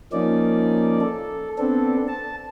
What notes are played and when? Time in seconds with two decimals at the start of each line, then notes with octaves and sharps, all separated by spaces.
0.13 F3 A#3 C#4 D#4 D5
1.01 A4
1.58 B3 C4 D4 A4
2.08 A5